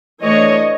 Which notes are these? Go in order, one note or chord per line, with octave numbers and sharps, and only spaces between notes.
E3 A3 D4 C#5 D#5